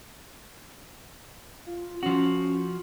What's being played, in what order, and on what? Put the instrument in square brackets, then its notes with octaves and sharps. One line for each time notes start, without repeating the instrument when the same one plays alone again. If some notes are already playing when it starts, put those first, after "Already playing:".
[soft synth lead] F4
[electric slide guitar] F3 F#4 [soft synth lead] C#4